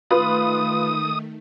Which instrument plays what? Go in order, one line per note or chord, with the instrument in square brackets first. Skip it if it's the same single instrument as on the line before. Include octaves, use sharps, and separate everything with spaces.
[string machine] D#3 A3 [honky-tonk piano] F4 B4 [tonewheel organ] D#6